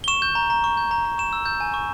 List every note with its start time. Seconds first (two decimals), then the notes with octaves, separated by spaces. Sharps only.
0.04 G7
0.08 C#6 E7
0.22 G6
0.35 A#5
0.50 A#5
0.64 C#6
0.77 G6
0.91 A#5
1.05 A#5
1.18 C#6 E7
1.33 E6
1.46 G6
1.60 G#5
1.74 C#6